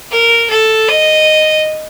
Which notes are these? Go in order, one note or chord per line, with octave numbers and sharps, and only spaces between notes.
A#4
A4
D#5